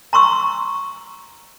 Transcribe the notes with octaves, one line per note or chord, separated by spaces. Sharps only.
A#5 C6 C#6 E6